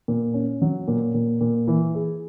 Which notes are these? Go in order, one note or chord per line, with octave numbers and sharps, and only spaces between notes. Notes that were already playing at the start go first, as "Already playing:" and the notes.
A#2
C#4
F#3
A#2
A#2
A#2
E3
G#4